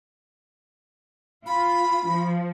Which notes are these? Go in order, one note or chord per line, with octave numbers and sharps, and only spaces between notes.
F4 B5
F3